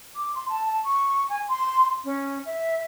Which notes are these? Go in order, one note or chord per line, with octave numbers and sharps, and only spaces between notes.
D6
C6
A5
A5
C#6
G#5
C6
C#4
E5